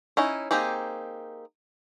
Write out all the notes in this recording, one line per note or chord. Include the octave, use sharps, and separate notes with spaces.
C#4 D#4 E4
A#3 C4 D#4 G4 G#4